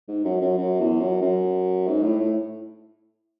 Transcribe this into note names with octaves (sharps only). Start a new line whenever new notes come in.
G#2
F#2
F#2
F#2
E2
F#2
F#2
G#2
A2
A2